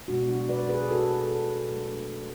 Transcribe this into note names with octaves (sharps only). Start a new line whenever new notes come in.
B2 G#3 B3 D4 F#4
F#4
B4 D5
G#4 B4
F#4 A4
F#3 A3 D4